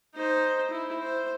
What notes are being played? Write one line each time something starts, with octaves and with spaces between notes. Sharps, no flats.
D#4 C5
E4
C5